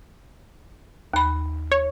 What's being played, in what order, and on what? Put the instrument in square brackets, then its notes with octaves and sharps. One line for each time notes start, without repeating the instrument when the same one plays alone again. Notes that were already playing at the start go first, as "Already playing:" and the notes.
[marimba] D#2 B5
[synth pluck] C#5